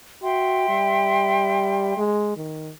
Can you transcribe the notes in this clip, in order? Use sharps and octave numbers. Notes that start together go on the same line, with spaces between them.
F#4 E5 G5 C6
G3
G#3
D#3